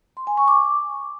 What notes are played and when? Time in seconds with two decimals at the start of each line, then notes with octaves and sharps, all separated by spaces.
0.17 C6
0.27 G#5
0.37 C#6
0.48 D6